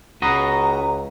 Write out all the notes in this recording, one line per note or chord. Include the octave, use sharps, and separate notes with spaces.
C#2 F#4 B4 D#5 A#5